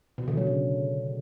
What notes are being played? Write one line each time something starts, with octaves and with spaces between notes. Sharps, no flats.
B2
D3
F#3
C#3